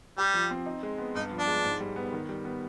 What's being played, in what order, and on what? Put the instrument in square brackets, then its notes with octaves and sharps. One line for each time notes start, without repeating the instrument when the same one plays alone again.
[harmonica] G3 [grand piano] G4
[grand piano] F3
C4
D#4
G#3
B3
[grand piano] G2 [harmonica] D#4
[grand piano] F3
[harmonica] D4
[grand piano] G#3
G#2
G3
B3
D#3
G3
B3